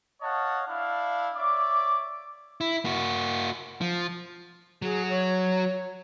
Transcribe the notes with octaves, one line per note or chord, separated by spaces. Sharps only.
C#5 D#5 F5 F#5 A5
D4 E4 F5
C#5 D5 E5 D6
E4
A#3 F#4
F3
F#3 F#4 G#4
C#5